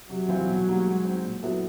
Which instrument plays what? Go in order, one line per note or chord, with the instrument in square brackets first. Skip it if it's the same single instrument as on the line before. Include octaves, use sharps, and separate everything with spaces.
[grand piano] C3 [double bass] F#3
[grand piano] E3 G3 C4 F4
B2
G3 A#3 D#4
G#3
C4 D#4
A#2
F#3 B3 E4 A4